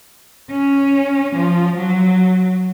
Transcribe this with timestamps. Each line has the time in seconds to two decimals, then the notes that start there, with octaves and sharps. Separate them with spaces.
0.50 C#4
1.35 F3
1.77 F#3